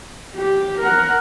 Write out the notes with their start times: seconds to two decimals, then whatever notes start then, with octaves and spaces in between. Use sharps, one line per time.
0.35 G4
0.80 A#4 F#5